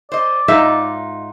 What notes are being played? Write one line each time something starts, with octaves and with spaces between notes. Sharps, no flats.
C5 D5 D#5
G#2 D#4 F4 E5